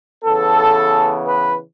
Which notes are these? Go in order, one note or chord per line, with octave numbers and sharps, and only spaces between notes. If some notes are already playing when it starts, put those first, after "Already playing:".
C#3 E3 B3 A4
B4